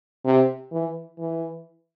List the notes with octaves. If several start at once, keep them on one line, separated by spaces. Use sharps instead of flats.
C3
E3
E3